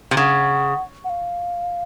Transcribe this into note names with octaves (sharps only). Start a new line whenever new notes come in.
C3
C#3 F#5
F#5
F5